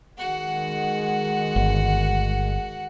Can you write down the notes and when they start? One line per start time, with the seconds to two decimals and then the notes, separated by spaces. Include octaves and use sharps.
0.18 D#3 G#3 F#4 F#5
1.56 G1